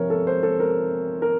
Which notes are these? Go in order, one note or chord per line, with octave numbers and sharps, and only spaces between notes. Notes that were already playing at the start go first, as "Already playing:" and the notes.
Already playing: C3 F3 C4 A#4 C#5
A4
C5
A4
A#4
A#4